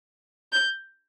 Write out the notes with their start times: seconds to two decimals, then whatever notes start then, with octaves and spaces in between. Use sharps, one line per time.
0.52 G6